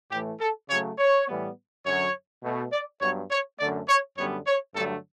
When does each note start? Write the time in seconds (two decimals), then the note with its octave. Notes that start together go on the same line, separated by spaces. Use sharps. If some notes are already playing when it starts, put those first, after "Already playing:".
0.12 A2 E3 A3 G4
0.41 A4
0.70 C#3 F#3 A3 C#5
0.98 C#5
1.28 A2 E3 G3 B3
1.85 F#2 D3 F#3 C#5
2.44 B2 A3
2.73 D5
3.01 G2 F#3 B3 C#5
3.30 C#5
3.60 F#2 D3 A3 D5
3.89 C#5
4.17 F#2 D3 G3 B3 C#5
4.47 C#5
4.75 G2 D3 F#3 A3 A4